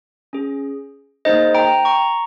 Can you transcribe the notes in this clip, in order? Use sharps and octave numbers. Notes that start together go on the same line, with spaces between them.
C#4 G#4
A#3 D#4 G#4 C5 D#5
G5 A#5
A#5 C#6